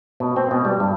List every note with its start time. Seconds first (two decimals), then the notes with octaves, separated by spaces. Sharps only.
0.20 B2
0.36 C4
0.51 B2
0.65 G3
0.80 G2